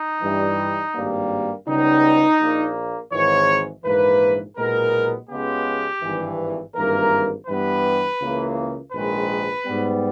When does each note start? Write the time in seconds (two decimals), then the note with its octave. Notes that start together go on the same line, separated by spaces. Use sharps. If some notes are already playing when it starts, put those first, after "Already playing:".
Already playing: D#4
0.22 G2 E3 G3
0.94 G#1 G2 G3 A#3
1.67 C#2 C#3 G3 B3 D#4
2.39 A#1 A#2 A#3
3.12 G#1 G#2 E3 C#5
3.84 A#1 G#2 E3 A#3 B4
4.57 B1 A#2 G#3 B3 A#4
5.29 C#2 C#3 G#3 B3 G4
6.02 G#1 G2 E3
6.75 G#1 G2 E3 A#3 A#4
7.47 G2 E3 G3 B3 B4
8.20 C#2 C#3 E3 A#3
8.93 A#1 G#2 D#3 G#3 B4
9.65 G#2 G3 B3